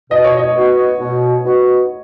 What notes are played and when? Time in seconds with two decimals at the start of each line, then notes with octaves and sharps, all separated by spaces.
0.11 B2 D#5
0.24 C#5
0.37 D#5
0.56 B3 D#4 F#4
1.00 B2
1.45 B3 D#4 F#4